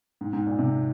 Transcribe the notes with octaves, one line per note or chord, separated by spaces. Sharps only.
G#2
G#2
A#2
C3